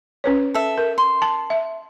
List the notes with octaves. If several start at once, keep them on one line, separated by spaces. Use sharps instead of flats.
C#4 B4 C#5
A4 E5
A#4
C6
A5
E5